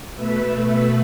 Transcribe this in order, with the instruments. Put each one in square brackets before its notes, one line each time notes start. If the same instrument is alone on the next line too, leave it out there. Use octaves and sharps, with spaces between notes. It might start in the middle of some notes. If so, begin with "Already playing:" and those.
[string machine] B2 A3 B4 E5